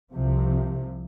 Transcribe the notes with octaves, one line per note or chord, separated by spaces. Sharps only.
C2 C3 F3